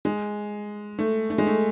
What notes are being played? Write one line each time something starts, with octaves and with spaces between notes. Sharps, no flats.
G#3
A3
A3
G#3
A3